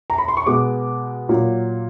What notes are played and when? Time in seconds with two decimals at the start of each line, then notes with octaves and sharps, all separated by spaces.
0.10 A#5
0.18 B5
0.28 C6
0.37 C#6
0.46 B2 G#3 B3 D6
1.29 A#2 F#3 A#3